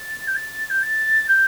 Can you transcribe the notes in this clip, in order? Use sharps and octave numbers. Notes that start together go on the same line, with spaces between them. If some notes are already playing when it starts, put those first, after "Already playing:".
Already playing: A6
G6
A6
G6
A6
G6